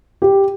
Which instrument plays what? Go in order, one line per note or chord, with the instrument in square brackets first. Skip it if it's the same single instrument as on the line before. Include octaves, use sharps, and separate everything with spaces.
[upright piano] G4